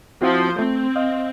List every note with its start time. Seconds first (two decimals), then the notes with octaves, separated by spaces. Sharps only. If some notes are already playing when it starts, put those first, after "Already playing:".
0.22 F3 C4 E4 F#4 C5
0.59 A3 C4
0.96 D#5 F5